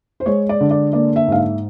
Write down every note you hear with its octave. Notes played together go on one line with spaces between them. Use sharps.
C5
G#3 C#5
D5
D3
D5
A#3 D5
E5
G#2 F5
E5